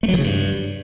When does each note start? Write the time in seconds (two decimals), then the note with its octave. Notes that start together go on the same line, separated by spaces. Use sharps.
0.03 A3
0.08 F#3
0.13 D#3
0.19 C#3
0.24 G2